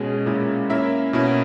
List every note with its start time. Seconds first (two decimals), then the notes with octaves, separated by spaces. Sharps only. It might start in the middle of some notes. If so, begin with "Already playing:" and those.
Already playing: B2 G#3 C#4 G#4
0.26 A#2 G#3 C#4 E4
0.70 A#3 C#4 E4 A#4 E5
1.13 B2 A#3 C#4 E4